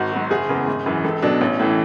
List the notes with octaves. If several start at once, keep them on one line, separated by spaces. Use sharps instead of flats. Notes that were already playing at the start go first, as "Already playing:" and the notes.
Already playing: G#1 F#4
G#2 F#3
F#1 G#4
E2 C#3
G#1
F#2 E3
C#2 A4
B2 F#3 D4
A1 C#4
A2 E3